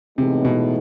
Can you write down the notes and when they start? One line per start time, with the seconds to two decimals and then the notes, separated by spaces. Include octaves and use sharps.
0.18 A2 C3 E3 G#3 B3 D#4
0.45 B2